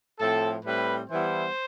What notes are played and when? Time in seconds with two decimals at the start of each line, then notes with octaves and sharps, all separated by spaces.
0.19 A2 F3 C4 A4
0.65 A2 G3 C4 B4
1.10 E3 G3 B3 E4 C5